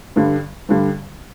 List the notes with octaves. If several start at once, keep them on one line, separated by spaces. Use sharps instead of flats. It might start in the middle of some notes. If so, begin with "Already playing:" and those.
G2 D3 G3
G2 D3 G3